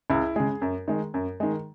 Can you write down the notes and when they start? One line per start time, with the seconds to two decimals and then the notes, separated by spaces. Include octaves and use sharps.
0.10 C#2 E4
0.36 C#3 G#3 G#4
0.62 F#2
0.88 D#3 G#3
1.14 F#2
1.40 D#3 G#3